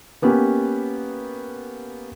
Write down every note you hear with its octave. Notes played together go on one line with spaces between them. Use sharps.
A#3 B3 C#4 G4